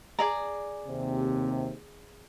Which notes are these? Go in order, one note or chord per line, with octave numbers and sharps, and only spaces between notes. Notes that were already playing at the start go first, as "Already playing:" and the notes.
G#4 D5 A#5
D#2 C3